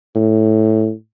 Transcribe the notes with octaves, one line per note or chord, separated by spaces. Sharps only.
A2